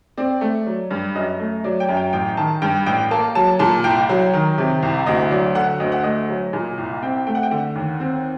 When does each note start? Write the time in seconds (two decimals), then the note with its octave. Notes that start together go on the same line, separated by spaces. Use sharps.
0.17 C4 D5
0.41 A3
0.66 F#3
0.91 G2
1.15 F#2 D#5
1.40 A3
1.64 F#3 D5
1.80 G5
1.89 F#2
1.97 G5
2.13 A1 G5
2.37 D#3 A5
2.62 G2 G5
2.86 A1 G5
3.11 A#3 A5
3.35 F#3 A5
3.59 A#2 A5
3.84 C2 G5
4.09 F#3
4.33 D#3
4.58 C3
4.83 C2
5.06 D2 D#5
5.31 F#3 D5
5.55 D3 F#5
5.80 D2 D#5
5.92 F#5
6.04 A3 D#5
6.29 F#3
6.53 A#2
6.78 C2
7.02 C4 G5
7.27 A3 G5
7.35 F#5
7.43 G5
7.51 D3 F#5
7.75 D#2
8.00 C4